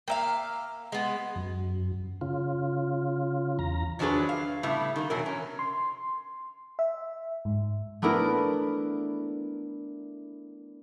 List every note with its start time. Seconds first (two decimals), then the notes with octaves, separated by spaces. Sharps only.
0.08 A#3 E5 F5 G5 A#5
0.92 G#3 B3
1.35 F#2
2.21 C#3 F4
3.59 E2 A#5
3.99 D#3 F3 F#3 D4 G#4 B4
4.29 F5
4.63 A2 C#3 G3 B3 E4
4.96 D#3 A#3
5.10 F2 B2 E3 F#3 A#4
5.26 C#4
5.59 C6
6.79 E5
7.45 G#2
8.02 A3 B3 D4 E4 A#4